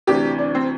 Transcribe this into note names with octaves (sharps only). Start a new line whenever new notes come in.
D2 C3 E3 D4 G4
D4
C4